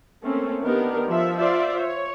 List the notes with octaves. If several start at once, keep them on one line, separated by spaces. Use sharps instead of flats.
A3 A#3 C4 C#4
D#3 B3 D4 G4 A#4
F3 E5
F4 C5 D5 E5
C#5